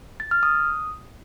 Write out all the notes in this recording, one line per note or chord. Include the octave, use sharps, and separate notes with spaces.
A6
F6
D#6